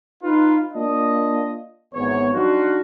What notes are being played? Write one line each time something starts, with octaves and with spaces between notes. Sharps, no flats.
D#4 F4 B4
A#3 D4 F4 D#5
G#1 E2 B3 C#5
F#3 D4 D#4 F4 F#4